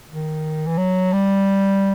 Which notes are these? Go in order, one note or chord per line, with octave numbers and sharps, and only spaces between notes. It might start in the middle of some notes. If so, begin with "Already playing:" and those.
D#3
E3
F#3
G3